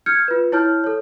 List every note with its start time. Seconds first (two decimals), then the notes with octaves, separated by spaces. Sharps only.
0.06 F6 G6 G#6 C#7
0.28 F4 B4
0.52 E4 C#5 A5 F6 G6
0.84 A4 C#5